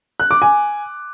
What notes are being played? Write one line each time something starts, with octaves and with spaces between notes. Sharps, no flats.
F#6
D6
G#5